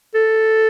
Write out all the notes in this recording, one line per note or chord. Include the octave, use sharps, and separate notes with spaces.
A4